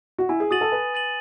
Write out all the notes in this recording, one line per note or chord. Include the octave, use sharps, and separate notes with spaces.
F#4
E4 G#5
G#4
F#4 D#6 A6 D#7 F#7
A4
B4 G#5
D#6 A6 D#7 F#7